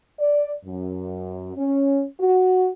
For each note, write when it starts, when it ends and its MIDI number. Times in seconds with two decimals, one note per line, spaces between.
0.18 0.52 74
0.64 1.52 42
1.56 2.06 61
2.20 2.69 66